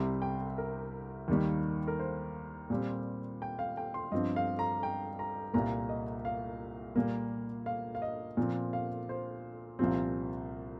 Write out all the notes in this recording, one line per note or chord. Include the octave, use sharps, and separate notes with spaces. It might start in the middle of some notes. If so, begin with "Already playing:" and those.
Already playing: C2 C3 G3 C6
G5
A#4
D#2 D#3 G3 A#3
A#4
C5
A#2 G3 C4
G5
F5
G5
C6
G2 F3 C4 D#5
F5
A#5
G5
A#5
C2 A#2 A#3 A#5
D#5
F5
A#2 G3 A#3
F5
F5
D#5
A#2 F3 C4
F5
C5
C2 A#2 F3 C4